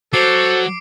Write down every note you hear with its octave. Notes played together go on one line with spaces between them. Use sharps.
F#3 A4 C5 D6 C7 D7